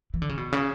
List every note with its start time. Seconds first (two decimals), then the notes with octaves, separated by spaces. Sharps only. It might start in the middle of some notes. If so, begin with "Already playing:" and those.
0.14 E3
0.22 D3
0.29 C#3
0.37 B2
0.52 C#3